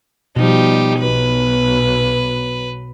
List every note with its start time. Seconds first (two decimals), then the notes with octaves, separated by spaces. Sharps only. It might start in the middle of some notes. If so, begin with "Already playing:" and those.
0.36 B2 F3 G3 D#4 G4
0.99 B1 F#3 B4